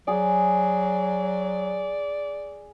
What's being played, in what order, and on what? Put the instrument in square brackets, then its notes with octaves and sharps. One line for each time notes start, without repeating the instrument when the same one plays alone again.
[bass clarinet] F#3 [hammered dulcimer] G#4 [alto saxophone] D5